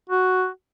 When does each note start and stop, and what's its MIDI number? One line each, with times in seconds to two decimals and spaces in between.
0.10 0.48 66